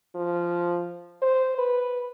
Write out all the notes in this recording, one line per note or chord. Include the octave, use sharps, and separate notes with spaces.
F3
C5
B4